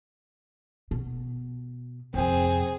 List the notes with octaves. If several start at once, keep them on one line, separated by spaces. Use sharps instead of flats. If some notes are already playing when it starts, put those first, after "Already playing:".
B2
F2 C3 C4 G#4